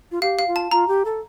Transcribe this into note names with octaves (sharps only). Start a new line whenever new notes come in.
F4
G4 F5
F5
F4
A5
F4 A#5
G4
A4